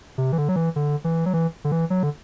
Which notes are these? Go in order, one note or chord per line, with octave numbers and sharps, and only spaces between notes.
C3
E3
D3
F#3
E3
D3
E3
F#3
E3
D3
E3
F#3
D3